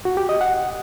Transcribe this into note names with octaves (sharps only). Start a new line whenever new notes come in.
F#4
G4
D#5
F#5